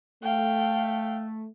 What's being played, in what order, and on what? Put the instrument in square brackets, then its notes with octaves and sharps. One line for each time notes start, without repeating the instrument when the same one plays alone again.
[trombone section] A3 [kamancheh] F5 G5